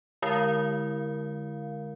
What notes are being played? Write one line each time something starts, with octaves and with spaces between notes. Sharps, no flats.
D3 G#3 E4 A#4 F5